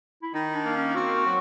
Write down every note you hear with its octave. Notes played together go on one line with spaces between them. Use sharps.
E4
D#3 D#4
D4
A#3
C#4
C4 F#4
F#3